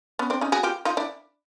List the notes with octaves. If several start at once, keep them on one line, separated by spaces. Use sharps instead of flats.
B3 C#4
C4 D4
C#4 D#4
F#4 G#4
F4 G4
D#4 F4
D4 E4